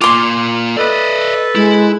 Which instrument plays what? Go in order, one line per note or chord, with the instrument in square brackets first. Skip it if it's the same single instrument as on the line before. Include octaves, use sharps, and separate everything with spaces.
[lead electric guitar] A#3 F4 [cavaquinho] C6 D6
[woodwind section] A4 B4 [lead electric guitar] D5 D#5
[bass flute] G#3 [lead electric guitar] E4